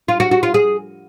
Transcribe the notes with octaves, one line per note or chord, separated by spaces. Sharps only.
F4
F#4
F#4
F4
G#4